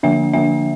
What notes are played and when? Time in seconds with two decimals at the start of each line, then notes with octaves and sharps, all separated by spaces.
0.03 D3 F3 A#3 D4 E5
0.33 D3 F3 A#3 D4 E5